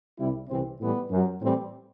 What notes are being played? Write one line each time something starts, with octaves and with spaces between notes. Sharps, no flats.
C2 C3 G3 E4
C2 C3 E3 C4
A2 E3 G3 B3
F#2 F#3
A2 E3 G3 C4